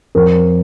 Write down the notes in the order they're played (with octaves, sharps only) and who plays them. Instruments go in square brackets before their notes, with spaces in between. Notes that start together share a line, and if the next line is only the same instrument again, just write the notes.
[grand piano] F2 A#4